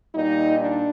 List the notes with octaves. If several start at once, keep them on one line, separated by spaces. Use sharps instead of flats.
A#2 G3 D#4
D4